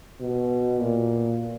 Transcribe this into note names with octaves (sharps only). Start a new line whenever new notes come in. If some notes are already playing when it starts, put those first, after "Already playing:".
B2
A#2